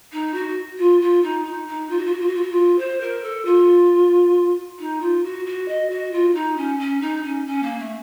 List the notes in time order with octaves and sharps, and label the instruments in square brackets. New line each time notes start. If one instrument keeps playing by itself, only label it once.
[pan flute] D#4
F#4
F4
F4
D#4
D#4
D#4
F4
F#4
F4
F#4
F4
F#4
F4
F#4
F4
C5
A#4
A4
F4
D#4
F4
F#4
F#4
D#5
F#4
F4
D#4
C#4
C#4
D#4
C#4
C#4
A#3
A3